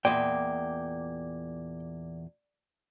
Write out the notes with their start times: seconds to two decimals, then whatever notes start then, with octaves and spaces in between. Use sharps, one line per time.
0.05 E2 A#2 D5 G5